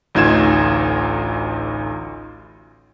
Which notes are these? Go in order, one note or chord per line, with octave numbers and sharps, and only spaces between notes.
A1 D2 D#4 F4 G#6 E7